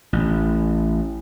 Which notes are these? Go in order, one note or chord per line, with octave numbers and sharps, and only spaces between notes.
A1